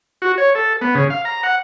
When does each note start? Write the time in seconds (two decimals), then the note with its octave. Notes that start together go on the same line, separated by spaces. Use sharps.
0.22 F#4
0.38 C#5
0.55 A4
0.81 B3
0.95 C#3
1.10 F5
1.25 A#5
1.43 F#5